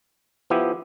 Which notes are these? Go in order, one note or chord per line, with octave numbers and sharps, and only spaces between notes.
F3 B3 E4 G4